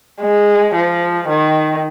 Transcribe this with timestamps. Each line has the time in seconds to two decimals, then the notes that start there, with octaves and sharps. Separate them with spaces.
0.21 G#3
0.75 F3
1.28 D#3